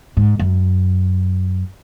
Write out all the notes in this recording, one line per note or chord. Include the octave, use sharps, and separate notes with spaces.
G#2
F#2